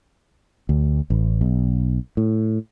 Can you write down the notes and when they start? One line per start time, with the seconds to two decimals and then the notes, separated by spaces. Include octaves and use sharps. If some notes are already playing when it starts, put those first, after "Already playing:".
0.69 D2
1.10 A1
1.41 B1
2.17 A2